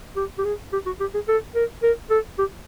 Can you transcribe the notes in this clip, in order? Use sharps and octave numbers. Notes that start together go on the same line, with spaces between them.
G4
G4
G#4
G4
F#4
G4
G#4
A4
A#4
A#4
A4
G4